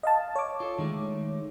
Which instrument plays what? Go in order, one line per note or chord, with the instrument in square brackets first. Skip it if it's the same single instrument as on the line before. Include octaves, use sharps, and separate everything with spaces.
[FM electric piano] D#5 F5 A5
C#5 D6
[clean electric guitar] F4 A4
D#3 G#3 A3